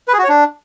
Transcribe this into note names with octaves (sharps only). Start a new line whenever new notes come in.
B4
G#4
F#4
C#5
D4